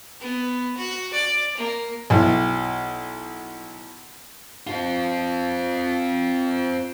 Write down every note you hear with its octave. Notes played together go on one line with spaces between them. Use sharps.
B3
F#4
D5
A#3
B1 E4
C4 F4